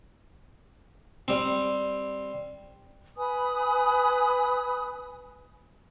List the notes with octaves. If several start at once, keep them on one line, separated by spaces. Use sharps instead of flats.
G3 C4
B4 G#5 B5 D#6